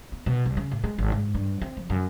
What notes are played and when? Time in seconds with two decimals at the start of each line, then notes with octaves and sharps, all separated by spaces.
0.12 B3
0.26 B2
0.46 C2
0.57 C#3
0.72 A2
0.84 G#3
0.98 G#1
1.12 G#2
1.34 G2
1.62 C4
1.77 F3
1.90 F#2